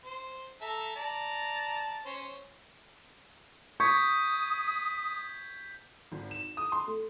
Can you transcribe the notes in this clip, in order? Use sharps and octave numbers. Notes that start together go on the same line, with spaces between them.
C5
A4 E5 A#5
D5 A5 A#5
C#4 C5 C#5
C#6 D#6 G6 G#6 B6
G#1
E7
D#6
C6
A3